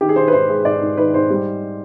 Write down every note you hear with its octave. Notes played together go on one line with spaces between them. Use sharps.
D#3 G4
G#4
D#3 C5
B4
G#2 C5
G#3
G#2 D5
G#2
D#3 B4
G#2 C5
G3